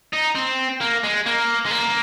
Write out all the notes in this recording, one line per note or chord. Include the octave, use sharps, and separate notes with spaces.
D#4
C4
A#3
G#3
A#3
G#3
A#3